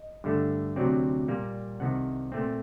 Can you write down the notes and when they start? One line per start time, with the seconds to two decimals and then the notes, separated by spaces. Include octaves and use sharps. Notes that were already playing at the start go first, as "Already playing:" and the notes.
Already playing: D#5
0.24 G2 D3 A3
0.76 D2 C3 F#3 C4 D5
1.28 A#2 G3 A#3
1.80 C2 C3 D#3 F#5
2.32 A#2 A3 C4